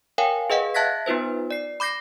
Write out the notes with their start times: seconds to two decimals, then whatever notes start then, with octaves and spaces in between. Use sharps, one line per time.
0.18 A#4 C#5 F5 G5 G#5
0.50 G#4 B4 D#5 F5 F#5
0.74 E5 A5 F#6 G#6 A#6 B6
1.06 B3 D#4 F4 B4 C5
1.51 D5 C7
1.80 B5 D6 G6 A#6 C7